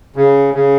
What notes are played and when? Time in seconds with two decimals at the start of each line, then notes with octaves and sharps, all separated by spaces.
0.16 C#3
0.54 C#3